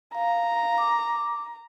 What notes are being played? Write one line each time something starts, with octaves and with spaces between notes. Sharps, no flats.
F5 A#5
D6